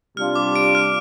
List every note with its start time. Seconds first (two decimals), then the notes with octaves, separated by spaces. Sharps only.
0.17 C3 G3 D4 F4 F6
0.36 D6
0.56 D7
0.75 F6